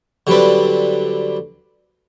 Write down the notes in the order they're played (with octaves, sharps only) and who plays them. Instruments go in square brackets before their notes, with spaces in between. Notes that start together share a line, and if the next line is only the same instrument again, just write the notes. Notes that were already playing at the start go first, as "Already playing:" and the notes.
[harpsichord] D3 F#3 G3 C4 B4